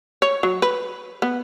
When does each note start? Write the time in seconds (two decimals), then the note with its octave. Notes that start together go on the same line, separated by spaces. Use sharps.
0.22 C#5
0.43 F#3
0.62 B4
1.22 B3